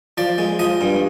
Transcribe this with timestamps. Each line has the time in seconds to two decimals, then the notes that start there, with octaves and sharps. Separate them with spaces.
0.17 F3 D5
0.38 G#3
0.59 F3 D#5
0.81 G2